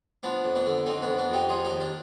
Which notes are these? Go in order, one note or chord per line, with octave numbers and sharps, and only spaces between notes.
F3 B3 D4
F2
B3 D4
D3
F2 C4 D#4
F2 B3 D4
B3 D4
F2 D#4 G4
F3 F4 G#4
D#4 G4
D#2
D4 F4